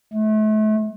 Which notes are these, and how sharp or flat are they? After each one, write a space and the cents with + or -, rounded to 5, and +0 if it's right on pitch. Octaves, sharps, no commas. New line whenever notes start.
A3 -35